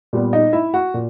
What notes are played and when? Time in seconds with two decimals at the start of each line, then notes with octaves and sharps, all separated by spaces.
0.13 A#2 G3 B3
0.33 D#4 D#5
0.53 E4 E5
0.74 F#4 F#5
0.94 A#2